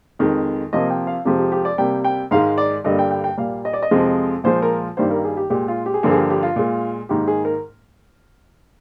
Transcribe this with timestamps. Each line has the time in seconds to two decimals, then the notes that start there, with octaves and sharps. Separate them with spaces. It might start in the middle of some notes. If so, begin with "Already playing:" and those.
0.19 F2 D#3 G#3
0.73 C3 F3 A#3 D#5
0.90 G5
1.07 F5
1.25 F2 C3 F3 G#3 G4
1.39 G4
1.52 G4
1.65 D5
1.78 C3 G3 A#3 G5
2.04 G5
2.31 G#2 D#3 G#3 F5
2.58 D5
2.84 G2 D3 G3 A#3 D#5
2.99 G5
3.11 G5
3.24 G5
3.37 A#2 G3 A#3 F5
3.65 D#5
3.73 D5
3.83 D#5
3.91 F2 C3 F3 G#3
4.44 A#2 F3 G#3 C5
4.62 A#4
4.97 G2 D#3 G3 A#3 C5
5.11 A#4
5.24 G#4
5.37 G4
5.50 A#2 G#3 G4
5.68 F4
5.86 G4
5.94 G#4
6.03 G2 D3 F3 A#3 G4
6.11 G#4
6.17 G4
6.30 G4
6.43 F4
6.56 A#2 G#3
7.09 G#2 D#3 A#3 G4
7.28 G#4
7.45 A#4